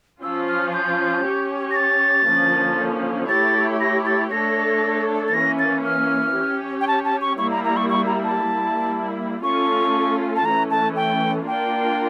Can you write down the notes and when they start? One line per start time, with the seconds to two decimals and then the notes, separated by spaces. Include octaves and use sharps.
0.22 F3 C#4 F4 E6
0.48 F6
0.74 G6
1.25 C#4 G4 C#5
1.71 A#6
1.76 A6
2.27 D3 F3 A#3 C#4
3.29 A3 E4 G4 C#5 A6
3.80 A#6
4.06 A6
4.31 A3 D4 A4 C#5 A#6
5.28 A6
5.34 E3 A#3 C#4 A#6
5.59 A6
5.85 F6
6.37 C#4 G4 C#5
6.81 G5
6.87 A5
7.05 A5
7.21 C#6
7.38 G3 A#3 E4 C#6
7.51 A#5
7.64 A#5
7.77 C#6
7.90 C#6
8.06 A#5
8.24 A5
8.40 G3 A#3 E4
9.43 A3 C#4 F4 A4 C#6
10.36 A5
10.45 E3 A3 C#4 A#5
10.71 A5
10.96 G5
11.47 A#3 D4 F4 A#4 G5